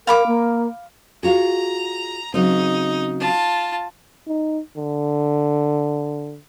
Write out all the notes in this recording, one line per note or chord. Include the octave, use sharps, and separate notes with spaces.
A#4 F5 B5 D6
A#3
F4 F#4 G#4 A#5
C#3 F#3 C4 D#4
F4 A5
D#4
D3